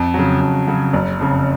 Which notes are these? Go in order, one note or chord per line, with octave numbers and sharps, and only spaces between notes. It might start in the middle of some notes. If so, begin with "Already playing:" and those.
Already playing: F2
C#3 F#3
F2
C#3 F#3
F#1
F2 C#3